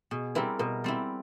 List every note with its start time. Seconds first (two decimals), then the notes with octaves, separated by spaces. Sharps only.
0.11 B2 G#4
0.35 G3 C4 E4 A#4
0.59 B2 A#4
0.84 G3 C4 E4